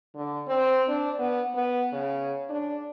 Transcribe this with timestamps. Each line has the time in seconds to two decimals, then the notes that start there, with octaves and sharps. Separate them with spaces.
0.15 D3
0.48 C4
0.89 D4
1.19 B3
1.55 B3
1.93 C#3
2.49 D4